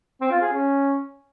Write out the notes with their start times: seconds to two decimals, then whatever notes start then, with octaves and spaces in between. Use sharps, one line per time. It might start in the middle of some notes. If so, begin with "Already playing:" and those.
0.21 C4
0.31 F4
0.42 G#4
0.52 C#4